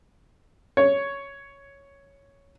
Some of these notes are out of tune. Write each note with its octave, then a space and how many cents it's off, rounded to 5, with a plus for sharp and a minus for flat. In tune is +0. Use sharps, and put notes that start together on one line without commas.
C#5 +5